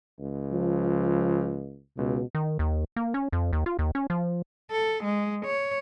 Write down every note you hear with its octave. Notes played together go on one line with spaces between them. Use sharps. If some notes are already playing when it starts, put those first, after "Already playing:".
C#2
F3
C#2 B2
D#3
D#2
A#3
C#4
F2
D#2
F4
D#2
C#4
F3
A4
G#3
C#5